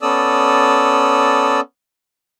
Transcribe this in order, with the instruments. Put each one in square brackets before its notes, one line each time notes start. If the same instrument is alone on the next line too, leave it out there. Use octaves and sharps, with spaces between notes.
[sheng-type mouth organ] B3 C#4 A4 D5 D#6 E6